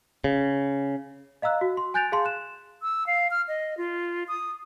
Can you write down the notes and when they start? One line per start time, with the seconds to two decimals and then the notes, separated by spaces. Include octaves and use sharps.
0.24 C#3
1.42 D#5 F5 A#5 E6 F#6
1.61 F#4
1.77 C6
1.94 G#5 F#6 G6 A6 D7 F7
2.12 G#4 F5 A5 C6
2.25 F#6 E7
2.82 E6
3.07 F5
3.31 F6
3.48 D#5
3.77 F4
4.28 D#6